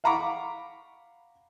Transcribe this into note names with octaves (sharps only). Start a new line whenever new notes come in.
F5 F#5 A#5 B5 C#6 D6